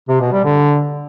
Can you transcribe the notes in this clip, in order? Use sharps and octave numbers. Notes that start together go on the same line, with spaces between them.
C3
B2
G3
D3